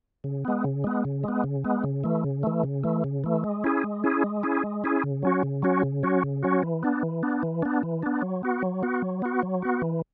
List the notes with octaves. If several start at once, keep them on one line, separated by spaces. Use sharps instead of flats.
C#3
G#3 B3
C#3
G#3 B3
C#3
G#3 B3
C#3
G#3 B3
C#3
E3 A3
C#3
E3 A3
C#3
E3 A3
C#3
E3 A3
G#3
C#4 E4 G#4
G#3
C#4 E4 G#4
G#3
C#4 E4 G#4
G#3
C#4 E4 G#4
C#3
F#3 C#4 F#4
C#3
F#3 C#4 F#4
C#3
F#3 C#4 F#4
C#3
F#3 C#4 F#4
E3
B3 D4
E3
B3 D4
E3
B3 D4
E3
B3 D4
F#3
B3 F#4
F#3
B3 F#4
F#3
B3 F#4
F#3
B3 F#4
E3